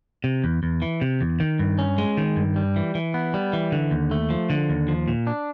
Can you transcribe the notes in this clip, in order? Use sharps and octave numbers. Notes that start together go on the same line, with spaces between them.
C3
E2
E2
E3
C3
E2
D#3
G2
C#4
G#3
D#3
G2
G3
E3
E3
B3
G3
E3
D3
D#2
A3
F3
D3
D#2
F3
A#2
D4